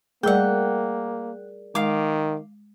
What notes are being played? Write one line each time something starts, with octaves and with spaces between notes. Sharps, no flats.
G3 A3 A#3 G#4 A#4 D5 F#5 G5
D#3 G#3 F5 D6